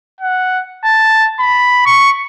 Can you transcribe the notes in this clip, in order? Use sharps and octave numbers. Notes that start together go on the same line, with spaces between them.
F#5
A5
B5
C#6